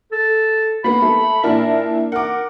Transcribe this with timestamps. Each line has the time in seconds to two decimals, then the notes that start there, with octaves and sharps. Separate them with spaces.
0.12 A4
0.84 A#3 B3 B5
1.02 A3
1.43 A#2 D4 E4 A#4
2.12 A#4 F#5 D6